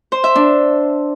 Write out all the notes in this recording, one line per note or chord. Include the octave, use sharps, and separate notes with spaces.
C5
E5
D4